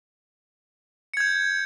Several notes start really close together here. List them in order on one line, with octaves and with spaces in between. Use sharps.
C#7 G#6 G6